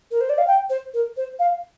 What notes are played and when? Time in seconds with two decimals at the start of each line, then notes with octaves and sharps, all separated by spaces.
0.11 A#4
0.21 C5
0.29 D5
0.38 F5
0.47 G5
0.70 C5
0.94 A#4
1.17 C5
1.39 F5